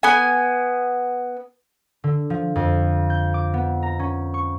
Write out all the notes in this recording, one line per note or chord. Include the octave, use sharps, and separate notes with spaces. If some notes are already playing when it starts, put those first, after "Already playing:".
B3 G#5
D3
F3
F2
G6
D6
B3
A#5
C#4
C#6